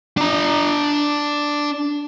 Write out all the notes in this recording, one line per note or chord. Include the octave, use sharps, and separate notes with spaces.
D4 A#5